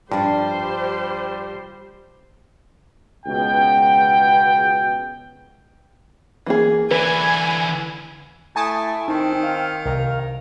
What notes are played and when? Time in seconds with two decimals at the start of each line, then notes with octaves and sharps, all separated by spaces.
0.12 G2 F3 G3 D4 G4 C5
3.26 C#2 B2 G5
6.46 E3 A#3 G#4
6.91 D3 E3 B4 G#5 B5
8.56 A3 E4 G#5 A5 D#6
9.08 D#3 C4 D#4
9.43 F5
9.86 C2 A#4